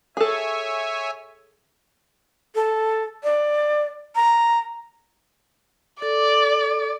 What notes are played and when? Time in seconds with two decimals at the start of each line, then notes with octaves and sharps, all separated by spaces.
0.17 G#4 A4 C#5 E5 G#5
2.55 A4
3.24 D5
4.16 A#5
6.02 A4 D5